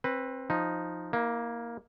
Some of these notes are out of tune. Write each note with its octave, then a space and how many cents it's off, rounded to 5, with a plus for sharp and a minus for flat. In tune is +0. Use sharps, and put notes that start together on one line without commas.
C4 +25 B4 +0
F3 +5 D#4 +0
A#3 +5 E4 -40